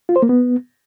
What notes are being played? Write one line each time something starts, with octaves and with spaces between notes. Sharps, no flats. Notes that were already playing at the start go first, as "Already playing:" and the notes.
F4
C5
A#3
B3